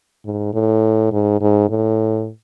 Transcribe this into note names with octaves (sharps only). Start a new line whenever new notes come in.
G#2
A2
G#2
G#2
A2